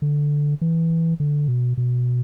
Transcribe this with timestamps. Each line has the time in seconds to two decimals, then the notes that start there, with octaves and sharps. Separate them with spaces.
0.02 D3
0.61 E3
1.20 D3
1.48 B2
1.77 B2